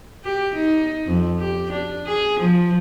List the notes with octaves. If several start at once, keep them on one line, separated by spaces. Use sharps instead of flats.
G4
D#4
F2
G4
D4
G#4
F3